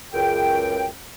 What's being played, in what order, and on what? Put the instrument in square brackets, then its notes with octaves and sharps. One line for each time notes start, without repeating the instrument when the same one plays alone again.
[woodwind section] C#2 F#2 G5